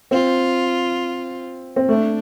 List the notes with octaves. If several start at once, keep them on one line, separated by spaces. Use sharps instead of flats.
C4 F4
C4
A3 D4